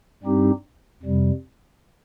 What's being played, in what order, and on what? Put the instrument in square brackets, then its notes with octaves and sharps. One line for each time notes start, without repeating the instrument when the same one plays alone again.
[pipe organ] G2 G3 C4 D#4 G4
F2 C3 G3